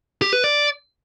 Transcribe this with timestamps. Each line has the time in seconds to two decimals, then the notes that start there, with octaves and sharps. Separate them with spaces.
0.22 G4
0.33 B4
0.44 D5